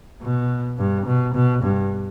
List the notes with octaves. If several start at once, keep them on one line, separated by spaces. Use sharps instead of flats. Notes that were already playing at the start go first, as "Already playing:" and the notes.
B2
G2
B2
B2
G2